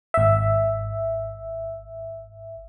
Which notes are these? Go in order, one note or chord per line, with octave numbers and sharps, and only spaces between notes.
G#1 E5